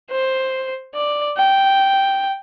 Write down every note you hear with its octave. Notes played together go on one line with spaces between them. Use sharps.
C5
D5
G5